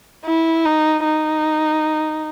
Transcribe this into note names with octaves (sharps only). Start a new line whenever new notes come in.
E4
D#4
D#4